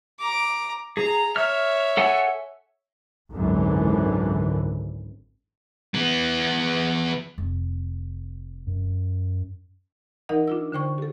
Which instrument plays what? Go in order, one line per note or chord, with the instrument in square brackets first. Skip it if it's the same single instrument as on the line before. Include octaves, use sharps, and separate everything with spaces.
[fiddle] A#5 D6
[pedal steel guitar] G#4 [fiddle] A#5
[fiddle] C#5 E5 [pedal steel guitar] F6
[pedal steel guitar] A4 F#5 G#5
[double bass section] G#1 C#2 F#2 D3 E3
[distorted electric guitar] E3 B3
[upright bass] F1
[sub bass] F#2
[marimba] E3 D#4 A#4 D#5 F#5
D4 F4 E6
D3 C5 G5 C#6
G4 A4